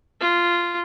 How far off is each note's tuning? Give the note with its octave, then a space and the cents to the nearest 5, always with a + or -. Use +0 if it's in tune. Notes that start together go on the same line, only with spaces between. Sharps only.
F4 -10